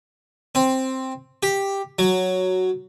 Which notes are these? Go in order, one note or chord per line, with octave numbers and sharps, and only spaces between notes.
C4
G4
F#3